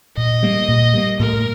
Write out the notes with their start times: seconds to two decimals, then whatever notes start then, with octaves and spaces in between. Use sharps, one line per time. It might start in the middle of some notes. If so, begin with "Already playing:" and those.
0.17 A#2 D#5
0.43 G3 A#3
0.68 A#2
0.94 G3 A#3
1.19 A2 A#4